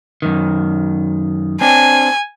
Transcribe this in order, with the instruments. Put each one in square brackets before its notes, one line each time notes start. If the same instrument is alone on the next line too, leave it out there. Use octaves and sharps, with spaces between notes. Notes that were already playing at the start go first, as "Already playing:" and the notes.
[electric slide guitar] F#2 D#3
[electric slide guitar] C4 D4 [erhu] G#5